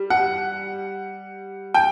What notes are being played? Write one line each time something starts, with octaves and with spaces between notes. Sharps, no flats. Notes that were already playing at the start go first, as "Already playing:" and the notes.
Already playing: G3
F#5
G5